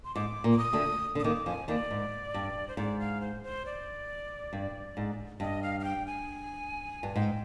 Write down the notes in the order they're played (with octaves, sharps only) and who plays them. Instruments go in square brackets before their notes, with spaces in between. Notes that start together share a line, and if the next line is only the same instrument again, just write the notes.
[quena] C6
[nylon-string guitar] G#2 [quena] D6
[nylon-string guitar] A#2
[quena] D6
D#6
[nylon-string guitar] D2 D3
D3
[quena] D#6
[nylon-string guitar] D#2 D#3 [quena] D6
[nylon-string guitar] F2 F3 [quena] G#5
[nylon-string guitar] D#2 D#3 [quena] D5
[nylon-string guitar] G#2
G2
[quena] C5
[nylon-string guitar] G#2 [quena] D5
[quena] F5
C5
C5
D5
[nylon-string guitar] G2
G#2
[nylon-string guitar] G2 [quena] D#5
[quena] F5
F5
G5
G#5
[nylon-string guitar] G2
[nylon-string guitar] G#2 [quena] G5